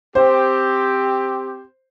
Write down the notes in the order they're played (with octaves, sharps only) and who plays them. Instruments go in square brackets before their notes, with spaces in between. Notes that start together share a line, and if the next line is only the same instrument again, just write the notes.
[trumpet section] C4 G4 [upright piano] C5